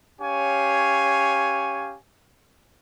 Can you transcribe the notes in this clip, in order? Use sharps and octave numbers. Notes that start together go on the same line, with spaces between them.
C#4 G4 C#5 F5 G#5